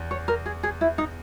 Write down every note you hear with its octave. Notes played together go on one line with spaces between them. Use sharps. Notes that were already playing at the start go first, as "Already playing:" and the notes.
Already playing: E2
C#5
A#4
G#4
G#4
E4
D#4